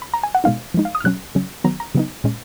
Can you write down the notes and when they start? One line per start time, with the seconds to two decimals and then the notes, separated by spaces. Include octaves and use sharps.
0.02 B5
0.14 A#5
0.23 G#5
0.35 F#5
0.44 B2 G#3 B3 D#4 F5
0.74 F3 G#3 D#4
0.85 F5
0.95 D#6
1.00 F6
1.04 B2 F#3 C#4 F#6
1.35 C#3 F#3 C#4
1.64 D#3 F#3 B3 A#5
1.80 A#5
1.95 C#3 F#3 B3 D#4
2.24 A#2 G#3 C#4